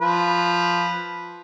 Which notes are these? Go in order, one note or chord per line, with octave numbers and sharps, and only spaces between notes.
F3 B4